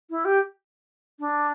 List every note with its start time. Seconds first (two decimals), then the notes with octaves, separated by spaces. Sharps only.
0.10 E4
0.25 G4
1.19 D4